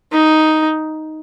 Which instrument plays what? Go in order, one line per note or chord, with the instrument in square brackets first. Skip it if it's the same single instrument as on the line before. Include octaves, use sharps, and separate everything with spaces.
[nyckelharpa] D#4